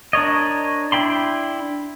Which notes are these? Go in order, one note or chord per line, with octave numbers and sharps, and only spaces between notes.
D4 A#4 C#5 D#5
D4 E4 G5 B5 C6